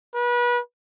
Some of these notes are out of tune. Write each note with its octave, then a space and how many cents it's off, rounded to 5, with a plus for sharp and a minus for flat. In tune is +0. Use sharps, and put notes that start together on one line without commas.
B4 -30